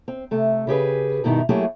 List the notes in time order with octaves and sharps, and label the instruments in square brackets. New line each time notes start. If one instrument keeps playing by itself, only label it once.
[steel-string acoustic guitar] C4
C3 A3
C#3 G4 G#4 B4
G2 B2 D#3 D#4 E4
F#3 A3 A#3 E4 G4 G#4